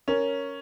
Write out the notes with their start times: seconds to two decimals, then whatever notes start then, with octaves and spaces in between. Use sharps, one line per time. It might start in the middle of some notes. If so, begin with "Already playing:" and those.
0.08 C#4 A#4